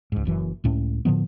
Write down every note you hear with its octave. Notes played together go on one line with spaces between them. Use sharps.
C#2 G#2
F#1 F#2 E3
C#2 A2 C#4
A2 D3 F3 B3